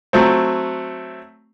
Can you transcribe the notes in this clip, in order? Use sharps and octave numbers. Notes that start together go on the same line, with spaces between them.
F#3 A3 C4